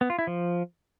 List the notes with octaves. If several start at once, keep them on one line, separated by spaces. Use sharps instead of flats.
B3
F4
E4
F3